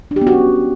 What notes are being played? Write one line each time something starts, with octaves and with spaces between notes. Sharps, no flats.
D4
G4
B3
F#4
C#4